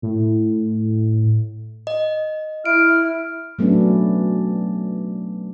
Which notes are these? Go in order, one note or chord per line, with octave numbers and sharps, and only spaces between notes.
A2
D#5
E4 F6 D7
F#3 A3 B3 C#4 D4